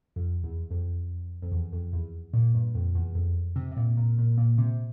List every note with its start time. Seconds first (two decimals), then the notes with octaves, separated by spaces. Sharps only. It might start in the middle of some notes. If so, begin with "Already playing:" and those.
0.16 F2
0.44 E2
0.71 F2
1.42 F2
1.52 E2
1.73 F2
1.93 E2
2.33 A#2
2.54 G2
2.75 F2
2.95 E2
3.15 F2
3.56 C3
3.71 C3
3.77 A#2
3.97 A#2
4.18 A#2
4.38 A#2
4.58 C3